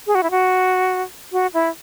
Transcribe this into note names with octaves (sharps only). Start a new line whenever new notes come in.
G#4
F#4
E4
F#4
F#4
E4